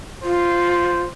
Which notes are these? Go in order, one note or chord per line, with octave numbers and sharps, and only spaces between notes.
F4 C5